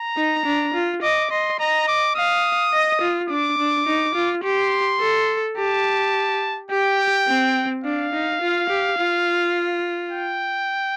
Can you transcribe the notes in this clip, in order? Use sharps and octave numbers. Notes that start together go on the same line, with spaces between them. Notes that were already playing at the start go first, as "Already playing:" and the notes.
Already playing: A#5
D#4
D4
F4
D#5 D6
D#5 C6
D#5 A#5
D6
F5 D#6
D#5
F4
D4 D6
D4
D#4
F4
G4 C6
A4
G4 A5
G4 G5
C4
D4 F5
D#4
F4
G4
F4
G5